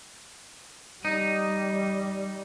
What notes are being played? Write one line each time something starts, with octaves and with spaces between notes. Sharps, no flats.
G3 D#4